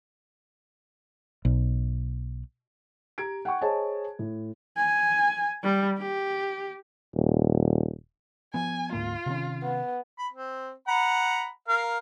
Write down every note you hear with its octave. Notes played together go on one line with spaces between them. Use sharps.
B1
G4 A#5 G#6 D7
F#5 G5 C#6
G#4 C5 C#5 D#5 G#5 A5
A2
G#5
G3
G4
D#1
F3 B3 G#5
D2 G#2 A#3 F4
C3 D#3 C#4
B3
B5
C4
F#5 A#5 B5
A#4 F5